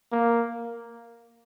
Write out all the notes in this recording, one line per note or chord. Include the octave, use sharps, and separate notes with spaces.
A#3